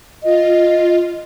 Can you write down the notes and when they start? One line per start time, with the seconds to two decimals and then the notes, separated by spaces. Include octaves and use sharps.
0.23 F4 D#5